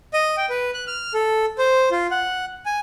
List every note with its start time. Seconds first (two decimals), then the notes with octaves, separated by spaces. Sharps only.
0.14 D#5
0.37 G5
0.50 B4
0.74 F#6
0.87 F6
1.14 A4
1.58 C5
1.91 F4
2.11 F#5
2.66 G#5